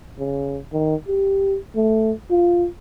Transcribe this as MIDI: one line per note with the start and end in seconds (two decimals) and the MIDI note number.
0.18 0.59 49
0.72 0.95 51
1.08 1.57 67
1.75 2.12 57
2.30 2.67 65